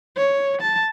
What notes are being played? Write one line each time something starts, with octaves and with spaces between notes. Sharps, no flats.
C#5
A5